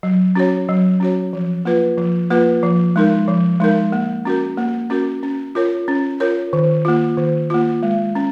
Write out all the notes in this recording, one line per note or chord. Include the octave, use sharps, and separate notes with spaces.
F#3
C#4 F#4 C#5
F#3
C#4 F#4 C#5
F3
A#3 F4 B4
F3
A#3 F4 B4
F3
G#3 D#4 A#4
F3
G#3 D#4 A#4
A#3
C#4 F#4 A#4
A#3
C#4 F#4 A#4
C#4
F4 A#4 C#5
C#4
F4 A#4 C#5
D#3
A#3 F4
D#3
A#3 F4
G#3
C#4